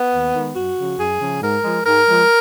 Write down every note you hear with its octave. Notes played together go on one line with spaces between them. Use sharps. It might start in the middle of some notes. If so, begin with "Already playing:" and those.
Already playing: B3
D#2
D#3 G#3
F#2 F#4
C#3 F3
F#2 G#4
C#3 F3
G#2 A#4
F3 G#3
G#2 A#4
F3 G#3